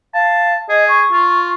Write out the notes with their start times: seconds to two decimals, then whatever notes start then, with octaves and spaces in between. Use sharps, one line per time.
0.14 F5 A5
0.69 G#4 D#5
0.88 C#6
1.12 F4